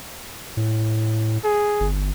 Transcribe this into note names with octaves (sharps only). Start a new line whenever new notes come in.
A2
G#4
G1